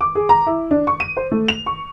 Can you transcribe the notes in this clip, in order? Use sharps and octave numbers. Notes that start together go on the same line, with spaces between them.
D6
G#4
A#5
E4
D4
C#6
D#7
C5
A3
F7
C#6